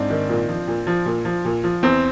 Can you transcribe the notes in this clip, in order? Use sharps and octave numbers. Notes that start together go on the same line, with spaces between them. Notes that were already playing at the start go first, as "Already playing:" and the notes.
Already playing: G#2 C4 D4
D#3
A#2
F3
A#2
F3
A#2
F3
A#2
F3
E2 C4